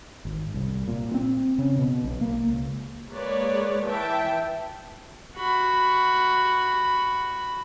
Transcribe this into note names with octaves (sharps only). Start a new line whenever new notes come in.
G#1
C2
A#2
C4
C#3
B2
B1
A#3
C#2
G#3 A#3 B4 C#5 D5
E3 E5 G5 A5
F#4 B5